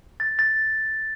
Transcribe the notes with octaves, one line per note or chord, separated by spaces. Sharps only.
A6
A6